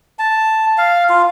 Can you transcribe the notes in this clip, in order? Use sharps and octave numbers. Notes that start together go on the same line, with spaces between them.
A5
F5
F4